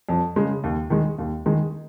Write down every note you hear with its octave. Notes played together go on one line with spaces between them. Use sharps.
F2
C#3 G#3
D#2
D#3 G#3
D#2
D#3 G#3